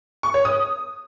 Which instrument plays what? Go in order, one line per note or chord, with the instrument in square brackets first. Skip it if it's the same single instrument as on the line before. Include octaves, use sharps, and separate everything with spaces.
[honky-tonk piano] C#6
C#5
D#6